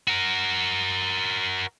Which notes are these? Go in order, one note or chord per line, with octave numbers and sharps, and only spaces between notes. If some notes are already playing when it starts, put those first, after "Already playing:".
F#4 A#4